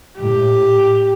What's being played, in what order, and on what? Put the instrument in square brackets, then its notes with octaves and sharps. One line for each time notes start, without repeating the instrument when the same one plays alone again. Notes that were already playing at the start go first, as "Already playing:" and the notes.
[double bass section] A2 [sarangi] G4